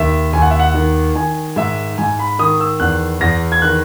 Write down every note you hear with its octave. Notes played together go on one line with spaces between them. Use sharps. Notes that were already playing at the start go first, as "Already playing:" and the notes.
Already playing: D#2 D#3 E5
D#2 G#5
F#5
E5
F#5
D#3
D#3 G#5
G#2 E5
G#2 G#5
B5
D#3 D#6
E6
E2 F#6
E2 A#6
G#6
D#3 F#6